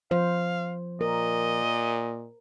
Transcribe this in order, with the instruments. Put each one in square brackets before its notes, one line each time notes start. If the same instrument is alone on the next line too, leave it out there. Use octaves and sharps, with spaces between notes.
[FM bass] F3 [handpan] C5 [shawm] F5
[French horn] A#2 [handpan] A#4 [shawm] D#5